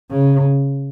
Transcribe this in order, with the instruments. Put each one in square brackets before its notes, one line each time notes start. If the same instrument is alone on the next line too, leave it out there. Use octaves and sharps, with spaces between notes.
[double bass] C#3